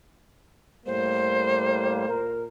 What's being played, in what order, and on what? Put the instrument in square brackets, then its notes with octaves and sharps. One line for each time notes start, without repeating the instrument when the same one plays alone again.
[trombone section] A2 G3 A#3 [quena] C5
[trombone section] A#2 A#4